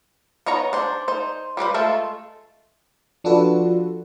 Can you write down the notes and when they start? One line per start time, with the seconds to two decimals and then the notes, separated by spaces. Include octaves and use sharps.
0.46 B3 D#4 C#5 A#5
0.73 D4 C5
1.08 D#4 C5
1.57 G3 G4 B4 C5
1.74 G#3 A3 F4 A4
3.24 F3 D4 F4 F#4 A4 B4